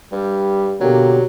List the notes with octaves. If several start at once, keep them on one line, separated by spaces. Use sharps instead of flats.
G2 G3
B2 D3 F#3 A#3 G4